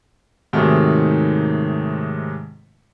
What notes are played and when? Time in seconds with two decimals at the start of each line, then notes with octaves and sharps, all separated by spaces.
0.53 G#2 C3 D#3 F#3 G#3 A3